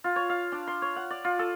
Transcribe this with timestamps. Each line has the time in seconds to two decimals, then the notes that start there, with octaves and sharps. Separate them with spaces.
0.04 F4
0.16 C#5
0.29 F5
0.52 D4
0.67 C6
0.82 C#5
0.96 F#5
1.10 D5
1.25 F4
1.39 A4